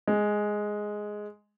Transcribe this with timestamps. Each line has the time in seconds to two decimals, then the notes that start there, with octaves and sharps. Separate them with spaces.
0.08 G#3